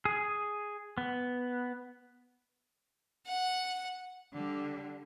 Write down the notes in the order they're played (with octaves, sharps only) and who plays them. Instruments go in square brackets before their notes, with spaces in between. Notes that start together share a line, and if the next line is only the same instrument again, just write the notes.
[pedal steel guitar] G#4
B3
[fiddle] F#5
[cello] D3 G3